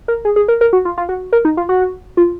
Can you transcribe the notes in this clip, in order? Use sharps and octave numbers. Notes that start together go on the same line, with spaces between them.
A#4
G#4
G#4
A#4
A#4
F#4
F4
F4
F#4
A#4
D#4
F4
F#4
F4